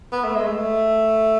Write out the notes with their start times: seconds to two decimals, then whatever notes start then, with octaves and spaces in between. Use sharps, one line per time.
0.12 B3
0.24 A3
0.35 G#3
0.47 A3